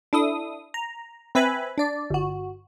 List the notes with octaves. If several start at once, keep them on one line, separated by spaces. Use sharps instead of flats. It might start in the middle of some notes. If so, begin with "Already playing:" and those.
D4 E4 A4 D#6
A#5
C4 B4 E5 G#5 B5
D4 D5
G1 F#4